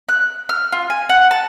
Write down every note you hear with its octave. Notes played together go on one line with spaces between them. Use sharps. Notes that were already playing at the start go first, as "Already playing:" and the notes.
F#6
F6
F4
G#5
F#5
A5